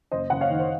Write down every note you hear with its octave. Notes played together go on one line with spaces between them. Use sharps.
F#1 C5 D#5
F#1 F#5
C#5 F5
D#3
C5